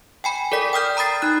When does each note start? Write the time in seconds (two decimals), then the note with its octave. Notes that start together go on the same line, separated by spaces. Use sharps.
0.24 G5 G#5 B5
0.52 A4 A#4 D5 B6
0.73 G5 D#6 F6 G6
0.97 A#5 B5 D#6 A6 C7
1.22 D#4 F#6